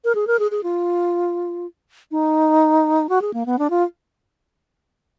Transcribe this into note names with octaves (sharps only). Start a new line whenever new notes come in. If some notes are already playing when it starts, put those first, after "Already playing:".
A#4
G#4
A#4
G#4
G#4
F4
D#4
F#4
G#4
A#3
B3
D4
F4